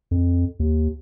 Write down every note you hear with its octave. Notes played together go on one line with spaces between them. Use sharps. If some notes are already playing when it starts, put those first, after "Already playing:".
F2
D#2